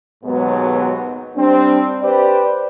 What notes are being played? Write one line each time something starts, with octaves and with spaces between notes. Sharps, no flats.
D#2 G#2 B2 F#3 G#3 B3
G3 C4 D4
G4 B4 C5 D5